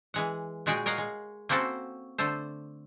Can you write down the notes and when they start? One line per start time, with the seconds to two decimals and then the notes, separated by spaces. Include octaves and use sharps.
0.14 E3 G#3 F#5
0.66 A#2 G#3 F#4 G#4 G5
0.86 A#4 C#5 D#5 F5 F#5
0.98 G#3
1.49 A#3 C4 C#4 F#4 A4 C5
2.18 D3 A3 A4 C5